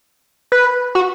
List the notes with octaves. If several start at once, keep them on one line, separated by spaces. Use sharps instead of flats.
B4
F#4